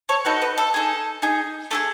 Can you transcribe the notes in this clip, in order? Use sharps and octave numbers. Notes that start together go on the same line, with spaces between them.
A4 C#5
D#4 F#4 A4 B4
B4
A4
D#4 G#4 A4
D#4 G#4
A3 E4 G#4 A4